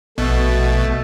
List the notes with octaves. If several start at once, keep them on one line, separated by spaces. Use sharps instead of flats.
A#1 B2 A3